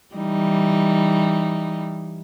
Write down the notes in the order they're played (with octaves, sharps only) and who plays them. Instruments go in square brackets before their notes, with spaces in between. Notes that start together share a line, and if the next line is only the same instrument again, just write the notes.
[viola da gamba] E3 G3 D#4